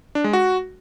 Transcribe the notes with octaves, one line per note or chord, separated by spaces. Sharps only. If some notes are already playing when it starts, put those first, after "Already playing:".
D4
G#3
F#4